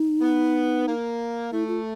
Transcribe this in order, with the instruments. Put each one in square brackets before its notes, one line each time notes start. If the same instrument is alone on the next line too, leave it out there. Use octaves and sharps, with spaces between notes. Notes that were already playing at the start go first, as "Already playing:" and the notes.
Already playing: [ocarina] D#4
[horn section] B3
A#3
[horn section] A3 [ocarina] E4
[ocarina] F4